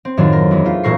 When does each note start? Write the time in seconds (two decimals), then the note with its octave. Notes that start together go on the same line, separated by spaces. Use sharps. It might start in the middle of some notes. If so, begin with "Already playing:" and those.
0.05 C4
0.17 F#2 A2 D#3 F#3 D4 F4
0.33 A#4
0.51 E2 G#3
0.65 A3 F4
0.84 E1 A#2 A3 A#4 C#6 C7